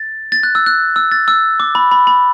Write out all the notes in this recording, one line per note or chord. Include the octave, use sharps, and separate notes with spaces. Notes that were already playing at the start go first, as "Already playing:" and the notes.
Already playing: A6
A6
F#6
E6
F#6
E6
A6
E6
D6
B5
B5
B5